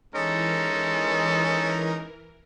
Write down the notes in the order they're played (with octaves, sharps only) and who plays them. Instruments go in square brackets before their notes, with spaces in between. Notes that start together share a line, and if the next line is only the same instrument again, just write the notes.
[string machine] E3 A#4 [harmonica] G#3 C#4 D#4 [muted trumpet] A4